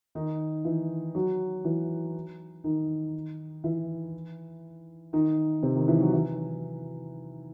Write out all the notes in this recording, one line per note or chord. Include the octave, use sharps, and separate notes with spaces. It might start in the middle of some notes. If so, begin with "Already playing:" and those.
D#3 D#4
E3 E4
F#3 F#4
E3 E4
D#3 D#4
E3 E4
D#3 D#4
C3 C4
D#3 D#4
E3 E4
F#3 F#4
E3 E4